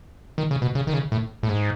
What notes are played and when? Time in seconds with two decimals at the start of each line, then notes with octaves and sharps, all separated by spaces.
0.38 D#3
0.51 C#3
0.62 B2
0.75 C#3
0.87 D#3
0.93 C#3
1.12 A2
1.43 A2
1.49 G#2